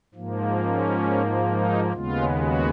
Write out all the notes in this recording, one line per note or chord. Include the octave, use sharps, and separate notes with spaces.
G#2 F3 A#3
C#4
D#4
D#2 C#3 G#3 B3 F4
F#4